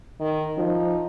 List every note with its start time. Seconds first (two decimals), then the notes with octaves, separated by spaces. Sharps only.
0.20 D#3
0.58 F3 D#4